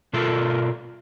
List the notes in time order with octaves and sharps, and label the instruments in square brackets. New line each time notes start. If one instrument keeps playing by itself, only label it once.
[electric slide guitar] B2 F4 A4 A#4 A5